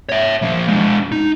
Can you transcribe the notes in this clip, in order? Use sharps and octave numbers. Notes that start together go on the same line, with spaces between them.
C#5 E5
F3 A#3
G#3 D4
D#4